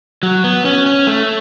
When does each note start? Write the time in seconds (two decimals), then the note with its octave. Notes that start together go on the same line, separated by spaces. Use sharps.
0.23 F#3
0.44 B3
0.65 C#4
0.86 C#4
1.07 A3